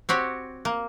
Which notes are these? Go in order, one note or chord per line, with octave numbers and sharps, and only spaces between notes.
C4 F#4 G4 C#5
A#3